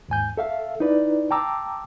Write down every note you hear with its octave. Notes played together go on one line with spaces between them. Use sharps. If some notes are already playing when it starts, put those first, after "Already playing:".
D#2 G#2 G#5 G6
A4 E5 F5
D#4 E4 B4 D5
G5 A5 A#5 D6 E6